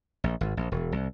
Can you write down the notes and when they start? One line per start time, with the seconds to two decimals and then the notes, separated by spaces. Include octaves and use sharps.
0.24 A#1
0.41 G#1
0.57 A#1
0.72 E1
0.92 C2